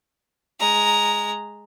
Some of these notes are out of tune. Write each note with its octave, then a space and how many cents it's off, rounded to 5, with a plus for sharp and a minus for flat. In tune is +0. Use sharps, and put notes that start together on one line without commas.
G#3 +0 A#5 +0